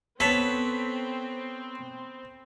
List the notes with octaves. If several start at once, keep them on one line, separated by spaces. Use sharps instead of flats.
B3 C4 A4 B4 C#5 B6